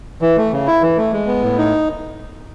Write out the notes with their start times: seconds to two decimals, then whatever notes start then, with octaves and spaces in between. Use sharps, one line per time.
0.22 E3
0.37 A3
0.53 C#3
0.67 E4
0.82 E3
0.97 A3
1.12 G#3
1.27 B3
1.42 A2
1.58 D#4